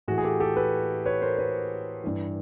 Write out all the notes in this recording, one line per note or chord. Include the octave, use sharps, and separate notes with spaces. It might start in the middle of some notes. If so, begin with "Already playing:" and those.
A2 E3 F#4 G#4
G#4
G4 A4
G4 A4
A4 B4
B4 C#5
A#4 C5
B4 C#5
G2 E3